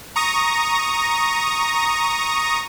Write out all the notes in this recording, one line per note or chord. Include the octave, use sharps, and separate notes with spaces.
A#5 C#6 D#6 A#6